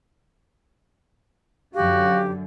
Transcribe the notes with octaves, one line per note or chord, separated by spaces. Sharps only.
F#2 D3 F#4 G4 F5